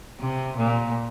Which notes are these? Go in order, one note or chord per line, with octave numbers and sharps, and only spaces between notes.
C3
A#2